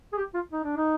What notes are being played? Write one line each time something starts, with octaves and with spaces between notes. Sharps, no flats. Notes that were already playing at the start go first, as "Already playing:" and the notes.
G#4
G4
F4
D#4
D4
D#4